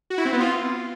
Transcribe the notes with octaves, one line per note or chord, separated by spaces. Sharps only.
F#4
E4
C4
B3
F4